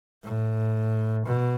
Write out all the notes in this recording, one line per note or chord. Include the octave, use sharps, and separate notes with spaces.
A2
B2